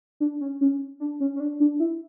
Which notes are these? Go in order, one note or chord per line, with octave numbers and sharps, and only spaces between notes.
D4
C#4
C#4
D4
C#4
C#4
D4
D4
E4